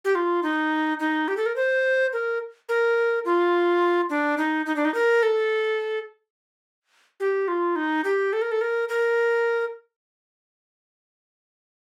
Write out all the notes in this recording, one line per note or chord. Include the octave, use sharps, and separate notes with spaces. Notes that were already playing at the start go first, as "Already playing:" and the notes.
G4
F4
D#4
D#4
G4
A4
A#4
C5
A#4
A#4
F4
D4
D#4
D#4
D4
D#4
A#4
A4
G4
F4
D#4
G4
A4
A#4
A4
A#4
A#4